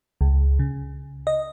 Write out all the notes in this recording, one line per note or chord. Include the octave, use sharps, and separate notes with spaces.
C#2
C#3
D#5